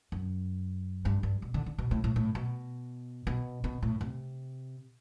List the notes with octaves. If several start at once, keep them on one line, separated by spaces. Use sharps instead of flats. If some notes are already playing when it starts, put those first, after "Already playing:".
F#2
G2
G2
B2
D3
D3
B2
A2
A2
A2
B2
B2
B2
A2
C3